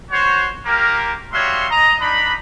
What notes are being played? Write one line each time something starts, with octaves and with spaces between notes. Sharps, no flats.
F#4 C5 C#5
A#3 F4 G4 A#4
G3 F#4 C#5 E5 F5 C6
D#5 A#5
D4 D#4 B5